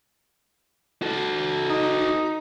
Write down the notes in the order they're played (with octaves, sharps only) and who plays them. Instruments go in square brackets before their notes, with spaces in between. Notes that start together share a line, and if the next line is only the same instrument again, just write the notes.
[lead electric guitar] F#4 A4
[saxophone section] D#4